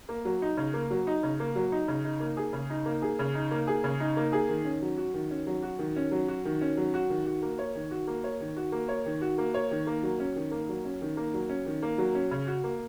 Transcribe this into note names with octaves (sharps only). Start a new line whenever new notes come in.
A#3
F#3
D#4
C#3
A#3
F#3
D#4
C#3
A#3
F#3
D#4
C#3
D#4
A#3
G#4
C#3
D#4
A#3
G#4
C#3
D#4
A#3
G#4
C#3
D#4
A#3
G#4
D#3
C#4
F#3
F#4
D#3
C#4
F#3
F#4
D#3
C#4
F#3
F#4
D#3
C#4
F#3
F#4
D#3
F#4
A#3
C#5
D#3
F#4
A#3
C#5
D#3
F#4
A#3
C#5
D#3
F#4
A#3
C#5
D#3
A#3
F#3
C#4
D#3
A#3
F#3
C#4
D#3
A#3
F#3
C#4
D#3
A#3
F#3
C#4
C#3
F#4
A#3